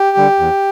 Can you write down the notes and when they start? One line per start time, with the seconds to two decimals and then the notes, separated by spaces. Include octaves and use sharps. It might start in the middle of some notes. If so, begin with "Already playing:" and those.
Already playing: G4
0.17 D3 G3
0.39 E2